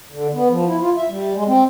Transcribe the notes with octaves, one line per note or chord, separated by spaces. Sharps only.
D3
B3
F3
E4
F4
E5
G3
G#3
C4